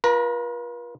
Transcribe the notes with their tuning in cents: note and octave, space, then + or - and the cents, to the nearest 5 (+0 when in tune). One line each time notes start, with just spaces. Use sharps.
F4 +0 B4 -45 A#5 +0